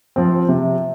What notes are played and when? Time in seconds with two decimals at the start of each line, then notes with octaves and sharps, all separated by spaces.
0.16 F3 C4
0.49 C3